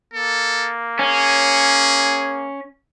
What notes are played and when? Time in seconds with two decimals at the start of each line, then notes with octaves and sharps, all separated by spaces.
0.14 A#3 A4
0.99 C#4 G#4